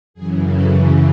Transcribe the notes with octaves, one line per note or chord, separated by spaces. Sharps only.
F#2 C#3 E3 G#4
A4